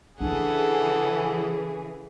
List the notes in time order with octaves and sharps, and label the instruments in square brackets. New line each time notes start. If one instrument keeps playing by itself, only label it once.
[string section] C#3 E3 G#4 [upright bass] D4 [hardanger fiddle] A4 F#5